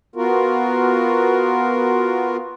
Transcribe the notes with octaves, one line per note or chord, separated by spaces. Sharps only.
B3 F4 F#4 A#4